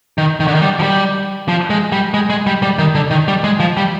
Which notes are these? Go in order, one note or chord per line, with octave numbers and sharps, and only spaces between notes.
D#3
D#3
D3
D#3
G3
F3
G3
F3
G#3
G3
G#3
G#3
G3
G3
D#3
D3
D#3
G3
G#3
F3
G3